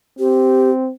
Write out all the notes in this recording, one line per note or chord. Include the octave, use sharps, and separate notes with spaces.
C4 G4